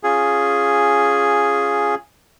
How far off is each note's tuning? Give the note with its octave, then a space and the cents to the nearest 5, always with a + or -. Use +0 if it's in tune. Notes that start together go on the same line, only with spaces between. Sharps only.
C#4 +0 F4 +0 G#4 +0